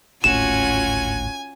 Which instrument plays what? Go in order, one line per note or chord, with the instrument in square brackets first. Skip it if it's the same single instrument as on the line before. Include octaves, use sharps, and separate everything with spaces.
[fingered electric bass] D1 G#1 A2 [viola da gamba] C#4 F4 F#4 [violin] G#5 [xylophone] E7